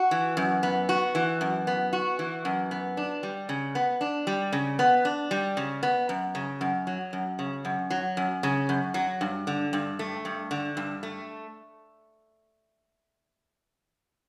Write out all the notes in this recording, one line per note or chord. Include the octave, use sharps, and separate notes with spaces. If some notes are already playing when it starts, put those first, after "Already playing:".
Already playing: F#4
E3
F#2
B3
F#4
E3
F#2
B3
F#4
E3
F#2
B3
D4
G3
C#3
B3
D4
G3
C#3
B3
D4
G3
C#3
B3
F#2
C#3
F#2
F#3
F#2
C#3
F#2
F#3
F#2
C#3
F#2
F#3
G2
D3
G2
A3
G2
D3
G2
A3